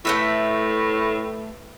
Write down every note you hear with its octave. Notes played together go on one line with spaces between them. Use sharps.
A2 A3 B4 E5